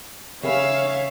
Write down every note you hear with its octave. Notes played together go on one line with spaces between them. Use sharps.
C#3 G#4 C#5 E5 F5 B5